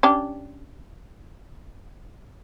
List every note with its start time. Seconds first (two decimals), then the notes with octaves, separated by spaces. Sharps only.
0.03 C#4 D4 G4